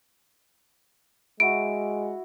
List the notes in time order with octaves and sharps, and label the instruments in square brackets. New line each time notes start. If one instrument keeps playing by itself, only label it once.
[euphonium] G#3 [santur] E4 F#4 [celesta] D7